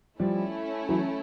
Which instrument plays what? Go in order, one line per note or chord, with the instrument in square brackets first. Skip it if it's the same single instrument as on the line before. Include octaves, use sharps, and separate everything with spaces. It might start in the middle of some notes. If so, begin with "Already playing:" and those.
[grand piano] F3 G3 [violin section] A3 C#4 E4
[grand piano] E3 F#3